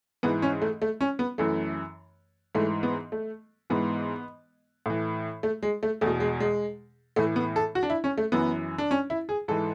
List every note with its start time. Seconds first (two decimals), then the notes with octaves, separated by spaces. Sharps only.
0.23 G#2 E3 B3
0.42 C#4
0.62 A3
0.82 A3
1.01 C#4
1.19 B3
1.38 F#2 E3 A3
2.55 G#2 E3 A3
2.83 B3
3.12 A3
3.70 G#2 E3 B3
4.86 A2 E3
5.43 A3
5.63 G#3
5.83 A3
6.01 E2 B2 A3
6.20 G#3
6.40 G#3
7.16 A2 E3 A3
7.36 B3
7.56 A4
7.75 F#4
7.83 D4
7.90 E4
8.04 C#4
8.18 A3
8.32 F#2 E3 B3
8.78 D4
8.91 C#4
9.10 E4
9.29 G#4
9.48 G#2 E3 A4